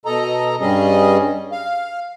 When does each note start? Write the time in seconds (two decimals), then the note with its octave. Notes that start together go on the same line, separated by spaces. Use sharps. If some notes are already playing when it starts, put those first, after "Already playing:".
0.05 B2 A4 D#5 A#5
0.61 G2 G3 C#4 G#4 D#5
1.52 F5